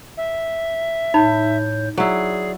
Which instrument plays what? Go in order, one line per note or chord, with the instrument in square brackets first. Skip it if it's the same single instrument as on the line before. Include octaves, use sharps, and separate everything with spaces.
[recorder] E5
[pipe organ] A2 C#5 G6 [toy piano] D#4 B5
[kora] F#3 E4 [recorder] G#4 [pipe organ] D5